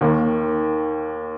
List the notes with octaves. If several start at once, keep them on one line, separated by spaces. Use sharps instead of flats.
D#2 D#3 A#3